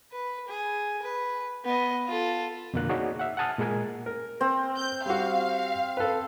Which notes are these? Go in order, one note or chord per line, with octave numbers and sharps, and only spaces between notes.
B4
G#4
B4
B3 D#5
F4 A4
F2 B2 D3 A#3 F#6
D#4 F#4 G#4 C#5 D5
E5 F#5
F#5 G#5 A5 D#6 F6
A#2 G#3 G#4 A#4 G#5
A#4
C4
G6
G3 F#4 F5
A4 B4